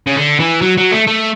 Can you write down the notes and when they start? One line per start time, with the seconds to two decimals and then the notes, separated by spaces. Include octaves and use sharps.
0.07 C#3
0.16 D3
0.40 E3
0.61 F#3
0.77 F#3
0.91 A3
1.07 A3